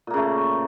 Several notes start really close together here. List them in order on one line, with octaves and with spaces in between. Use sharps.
A#2 A#3 C#3 A3